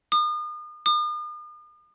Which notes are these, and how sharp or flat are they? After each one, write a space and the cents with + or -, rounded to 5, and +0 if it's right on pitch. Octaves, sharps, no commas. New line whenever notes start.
D#6 -40
D#6 -45